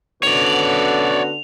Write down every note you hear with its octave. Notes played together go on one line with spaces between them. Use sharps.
D3 B3 C#4 F#4 C#5 D5 F7